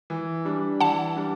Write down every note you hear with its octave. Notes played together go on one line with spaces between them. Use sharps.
E3
G3 D4
E3 F#5 A5
G3 D4